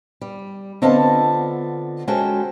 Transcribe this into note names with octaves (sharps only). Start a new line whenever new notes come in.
G3
D3 B3 C4 F4 D#5 A5
G#3 C#4 F#4 A4 C5 G5